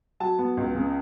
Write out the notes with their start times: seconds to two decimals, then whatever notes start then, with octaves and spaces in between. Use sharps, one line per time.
0.20 F#3 A5
0.39 B3
0.57 C#2
0.75 C#3